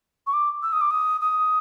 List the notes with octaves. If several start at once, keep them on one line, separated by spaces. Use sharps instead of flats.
C#6
D6
E6
D#6
D6
D#6
D#6